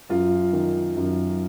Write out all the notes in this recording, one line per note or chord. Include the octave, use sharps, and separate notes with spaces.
F#2 F4
D#3
F#2